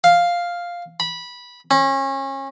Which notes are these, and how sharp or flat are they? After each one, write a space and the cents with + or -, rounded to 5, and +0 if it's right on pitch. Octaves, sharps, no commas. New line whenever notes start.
F5 +0
B5 -15
C#4 -30